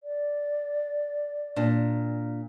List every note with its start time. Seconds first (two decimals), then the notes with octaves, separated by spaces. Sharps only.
0.03 D5
1.56 A#2 D4